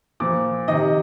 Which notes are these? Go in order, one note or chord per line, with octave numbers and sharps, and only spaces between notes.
A#2 F3 D6
C3 D#3 D#5